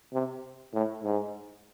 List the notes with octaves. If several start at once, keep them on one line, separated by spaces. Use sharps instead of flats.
C3
A2
G#2